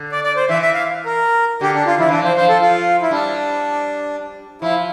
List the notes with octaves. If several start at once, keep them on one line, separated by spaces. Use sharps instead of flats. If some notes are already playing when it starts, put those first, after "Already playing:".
Already playing: D3
D5
D5
C5
E3 E5
E5
F5
A#4
D3 G4
D4
F4
F3 E4
E3 D4
F3
C5
F3 C5
A4
F4
E4
G3 D4
F3 E4